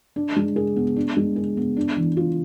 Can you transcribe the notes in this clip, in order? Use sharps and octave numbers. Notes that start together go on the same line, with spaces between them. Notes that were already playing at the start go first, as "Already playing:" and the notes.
D4
G#3
G#4
B3
D4
G#3
G#4
B3
D4
E3
F4